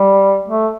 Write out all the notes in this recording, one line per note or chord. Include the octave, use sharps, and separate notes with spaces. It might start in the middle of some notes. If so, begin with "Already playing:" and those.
Already playing: G3
A3